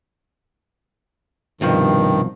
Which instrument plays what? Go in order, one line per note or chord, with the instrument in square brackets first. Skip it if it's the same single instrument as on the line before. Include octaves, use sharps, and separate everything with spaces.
[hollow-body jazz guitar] C2 B2 F3 [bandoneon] G2 D#3